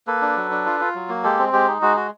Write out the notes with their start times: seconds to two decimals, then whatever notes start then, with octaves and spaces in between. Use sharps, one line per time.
0.07 A#3 A4 B4
0.22 D4
0.37 F#3
0.51 D4
0.66 F4
0.80 F4
0.95 F#3
1.09 A#3
1.24 G#3 G4 A4
1.39 C4
1.53 G#3 G4
1.68 D#4
1.82 G#3 F#4
1.96 F#4